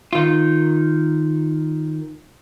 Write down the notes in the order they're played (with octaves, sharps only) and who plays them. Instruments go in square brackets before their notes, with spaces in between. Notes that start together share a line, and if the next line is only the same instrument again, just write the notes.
[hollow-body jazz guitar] D#3 F4